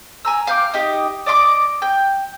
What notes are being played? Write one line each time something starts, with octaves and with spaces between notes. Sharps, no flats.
G#5 A#5 E6
F5 G5 D6
D#4 G4 D#5
D5 D#5 C6 D6
G5